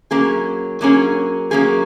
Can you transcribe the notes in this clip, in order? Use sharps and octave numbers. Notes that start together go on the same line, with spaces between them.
F#3 A#3 C#4 G#4
F#3 A#3 C#4 G#4
F#3 A#3 C#4 G#4